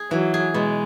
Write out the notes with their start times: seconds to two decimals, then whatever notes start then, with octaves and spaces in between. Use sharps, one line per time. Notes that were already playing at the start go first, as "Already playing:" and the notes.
Already playing: G#4
0.11 E3 F#3
0.34 G#4
0.54 B2 G#3